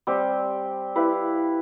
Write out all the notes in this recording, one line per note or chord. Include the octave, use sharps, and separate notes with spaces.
G3 C4 G4
E4 G4 B4 F5